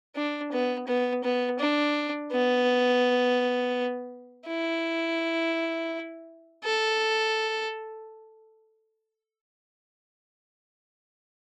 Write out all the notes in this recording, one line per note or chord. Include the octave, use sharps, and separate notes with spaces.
D4
B3
B3
B3
D4
B3
E4
A4